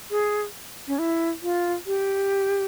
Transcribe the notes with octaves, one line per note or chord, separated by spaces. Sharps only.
G#4
C#4
E4
F4
G4